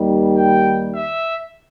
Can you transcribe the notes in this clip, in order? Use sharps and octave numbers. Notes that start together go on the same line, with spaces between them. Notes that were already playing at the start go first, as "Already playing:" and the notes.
Already playing: D#2 D#3 G3
G5
E5